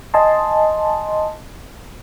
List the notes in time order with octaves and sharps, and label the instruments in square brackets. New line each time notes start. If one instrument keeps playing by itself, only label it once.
[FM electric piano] D#5 G#5 A5 C6